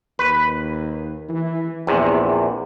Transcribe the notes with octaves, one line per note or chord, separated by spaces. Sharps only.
D#2 B4
E3
A#1 E2 C3